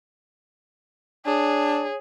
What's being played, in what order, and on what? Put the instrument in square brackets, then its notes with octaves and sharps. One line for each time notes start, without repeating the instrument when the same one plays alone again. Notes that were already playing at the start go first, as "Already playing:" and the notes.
[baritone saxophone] D4 [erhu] G#4 [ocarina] C#5